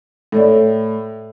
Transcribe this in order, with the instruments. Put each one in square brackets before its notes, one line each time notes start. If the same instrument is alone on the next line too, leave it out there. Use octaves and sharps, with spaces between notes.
[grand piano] A2 [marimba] A4 C#5 D5